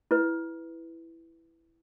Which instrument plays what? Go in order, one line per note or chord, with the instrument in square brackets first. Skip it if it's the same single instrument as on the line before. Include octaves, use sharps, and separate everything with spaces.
[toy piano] E4 B4